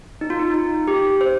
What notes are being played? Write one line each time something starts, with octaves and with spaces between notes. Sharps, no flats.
D#4
F4
D#4
D#4
G4
C5